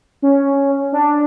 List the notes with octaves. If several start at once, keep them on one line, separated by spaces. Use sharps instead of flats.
C#4
D4